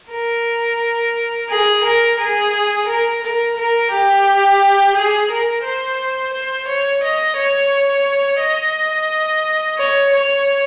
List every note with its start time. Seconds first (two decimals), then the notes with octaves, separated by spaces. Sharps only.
0.11 A#4
1.50 G#4
1.84 A#4
2.19 G#4
2.87 A#4
3.23 A#4
3.57 A#4
3.91 G4
4.96 G#4
5.30 A#4
5.64 C5
6.33 C5
6.68 C#5
7.03 D#5
7.37 C#5
8.41 D#5
9.78 C#5
10.13 C#5